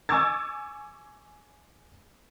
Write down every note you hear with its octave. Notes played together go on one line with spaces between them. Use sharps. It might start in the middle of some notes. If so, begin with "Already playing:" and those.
G#5 C#6 D6 E6 G#6 A6